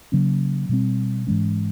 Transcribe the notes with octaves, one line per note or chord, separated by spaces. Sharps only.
C#3 F#3 A#3 C#4
B2 G3 C4
G#2 E3 G#3 C#4